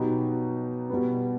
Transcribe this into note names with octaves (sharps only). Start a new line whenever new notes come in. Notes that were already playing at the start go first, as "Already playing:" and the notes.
Already playing: B2 F#3 B3 D#4 G4
B2 G3 B3